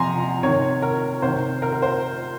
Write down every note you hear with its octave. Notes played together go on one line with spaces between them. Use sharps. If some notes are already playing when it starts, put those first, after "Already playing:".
Already playing: C3 F3 G#5 A#5 C6
C3 D#3 C#5
A#4
C3 D#3 C5
A#4
A#4
C5